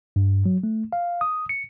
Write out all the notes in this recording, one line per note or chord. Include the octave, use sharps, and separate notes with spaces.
G2
F#3
A3
F5
D#6
C#7